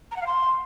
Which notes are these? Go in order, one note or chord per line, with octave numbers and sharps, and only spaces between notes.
A#5
F#5
F5
C6